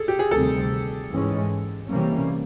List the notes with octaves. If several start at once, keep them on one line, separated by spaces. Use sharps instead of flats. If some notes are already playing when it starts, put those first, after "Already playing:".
Already playing: G#4 A4
G4
G#4
D2 C3 D#3 G3 C4 A4
G#2 E3 G#3 C#4
C3 E3 G3 A#3 C#4